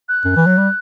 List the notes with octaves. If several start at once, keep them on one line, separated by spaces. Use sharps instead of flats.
F#6
F#2
E3
F#3
G3